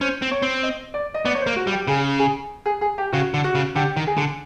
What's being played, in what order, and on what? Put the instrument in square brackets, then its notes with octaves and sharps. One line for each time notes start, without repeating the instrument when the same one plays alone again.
[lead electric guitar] C#4 [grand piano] C5
[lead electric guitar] C4
[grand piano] C#5
[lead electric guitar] C4
[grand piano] D#5
D5
D#5
[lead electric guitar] B3 [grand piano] D5
[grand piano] C#5
C5
[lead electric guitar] A#3
[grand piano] F#4
[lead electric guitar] G3
[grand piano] G4
[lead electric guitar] C#3 [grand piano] G#4
[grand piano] G#4
G#4
G#4
G4
[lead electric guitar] C#3 [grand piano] F#4
[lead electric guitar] D3
[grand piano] F#4
[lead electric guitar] C#3
[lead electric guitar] D3 [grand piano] G4
[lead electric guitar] D#3
[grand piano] G#4
[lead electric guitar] D3